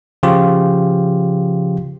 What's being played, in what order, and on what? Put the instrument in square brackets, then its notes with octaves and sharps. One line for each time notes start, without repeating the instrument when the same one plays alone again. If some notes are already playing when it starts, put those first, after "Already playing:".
[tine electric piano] C#3 F3 F4 G4